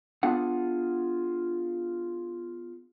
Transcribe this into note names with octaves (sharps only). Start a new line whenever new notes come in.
B3 D4 F4 G#4 F#5